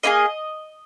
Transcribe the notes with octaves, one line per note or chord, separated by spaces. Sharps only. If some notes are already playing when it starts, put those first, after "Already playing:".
A#3 E4 G#4 D#5